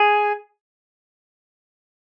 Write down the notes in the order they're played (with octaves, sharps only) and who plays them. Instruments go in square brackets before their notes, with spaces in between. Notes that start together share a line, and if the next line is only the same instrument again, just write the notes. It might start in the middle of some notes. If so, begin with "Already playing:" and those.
Already playing: [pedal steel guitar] G#4